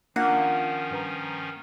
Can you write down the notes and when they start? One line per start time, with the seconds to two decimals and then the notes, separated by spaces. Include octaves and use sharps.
0.16 D#3 F3 A#3 C#4 D4 F4 F#5
0.91 G2 B4 A#5